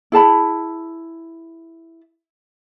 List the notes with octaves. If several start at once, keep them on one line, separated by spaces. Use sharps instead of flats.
E4 G#4 A5 B5